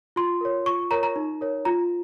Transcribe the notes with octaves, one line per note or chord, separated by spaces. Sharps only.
F4 C6
A#4 C#5
F4 C#6
A#4 C#5 A#5
A#5
D#4
A#4 C#5
F4 A#5